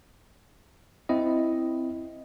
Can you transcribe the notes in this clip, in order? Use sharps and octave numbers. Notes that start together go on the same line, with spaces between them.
C4 E4 D#5